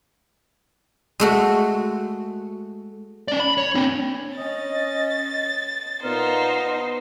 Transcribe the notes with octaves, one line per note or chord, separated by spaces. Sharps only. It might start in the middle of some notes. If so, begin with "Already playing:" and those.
G#3 A3 F#4
C#4 D5
B5
C#5
C4 D4
C#4 D#5 A6
A#2 B3 D#4 C5 F5